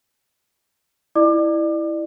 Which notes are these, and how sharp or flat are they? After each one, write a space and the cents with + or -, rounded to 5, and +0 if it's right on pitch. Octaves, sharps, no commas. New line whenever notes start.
E4 +0 D5 +30 D6 +30